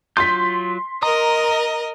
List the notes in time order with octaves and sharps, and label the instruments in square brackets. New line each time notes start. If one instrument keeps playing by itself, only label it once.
[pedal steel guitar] F#3 F4 G6 [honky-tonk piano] C6 B6
[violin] A#4 D#5 [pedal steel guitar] A#5 D#6